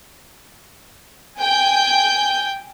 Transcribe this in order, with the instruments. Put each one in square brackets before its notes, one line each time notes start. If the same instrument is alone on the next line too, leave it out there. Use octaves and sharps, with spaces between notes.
[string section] G5 G#5 G6